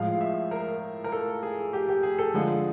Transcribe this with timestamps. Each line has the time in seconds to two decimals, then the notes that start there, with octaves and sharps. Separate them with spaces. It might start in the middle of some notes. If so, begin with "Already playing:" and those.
Already playing: A2 F3 G#3 F5
0.21 E5
0.51 A#4
1.04 A#4
1.12 A4
1.43 G#4
1.73 G4
1.88 G4
2.03 G#4
2.18 A4
2.34 D3 F3 G#3